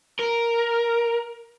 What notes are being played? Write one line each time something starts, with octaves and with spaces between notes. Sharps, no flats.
A#4